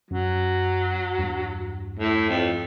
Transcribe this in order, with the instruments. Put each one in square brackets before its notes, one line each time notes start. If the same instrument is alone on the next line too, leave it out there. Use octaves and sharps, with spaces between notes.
[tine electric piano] F#2 [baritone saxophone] F#3
[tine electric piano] E2 G2
[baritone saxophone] A2
F2